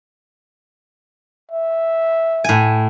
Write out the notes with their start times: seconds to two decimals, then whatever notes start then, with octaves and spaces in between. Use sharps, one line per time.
1.51 E5
2.44 A2 G#5